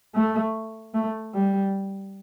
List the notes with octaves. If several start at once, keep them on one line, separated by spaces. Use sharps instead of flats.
A3
A3
G3